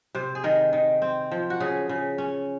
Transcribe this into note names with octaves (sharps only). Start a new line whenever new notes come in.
C3 C5
G#4
D#3 A#4
D#3
C4
F3
F#4
C#3 G#4
C#3
C#4